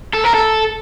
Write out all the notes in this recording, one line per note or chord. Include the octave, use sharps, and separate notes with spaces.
A4
A#4
A4